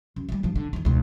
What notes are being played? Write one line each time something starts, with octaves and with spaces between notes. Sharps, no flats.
F#2
D#3 G3
G2 F3
D3
E2 D#3
E1 C#2